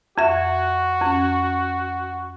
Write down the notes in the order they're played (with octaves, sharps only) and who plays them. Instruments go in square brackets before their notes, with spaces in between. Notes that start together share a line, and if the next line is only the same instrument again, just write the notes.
[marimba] F2 E5 [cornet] F#4
[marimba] F2 C#4